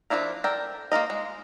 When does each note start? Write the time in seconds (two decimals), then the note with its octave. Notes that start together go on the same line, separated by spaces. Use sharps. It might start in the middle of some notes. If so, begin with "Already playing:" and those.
0.10 F3 B3 D4 E4 A#4
0.44 A4 A#4 D5 G5
0.92 A#3 F4 A#4 D#5
1.10 G#3